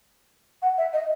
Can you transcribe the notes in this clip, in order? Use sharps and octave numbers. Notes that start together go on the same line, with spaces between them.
F#5
E5
D#5